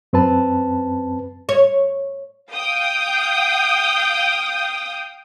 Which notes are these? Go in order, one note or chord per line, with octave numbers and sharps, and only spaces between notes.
F#2 C4 B4 A5
C#5
F5 G5 D#6